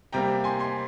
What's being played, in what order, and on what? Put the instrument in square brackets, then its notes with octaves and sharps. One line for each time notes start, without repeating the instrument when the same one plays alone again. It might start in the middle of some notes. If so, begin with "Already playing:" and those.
[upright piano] C3 G3 A#3 G5 A#5
G#5 C6
G#5 C6